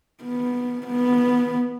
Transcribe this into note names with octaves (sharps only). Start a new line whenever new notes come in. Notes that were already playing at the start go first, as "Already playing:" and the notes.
B3
B3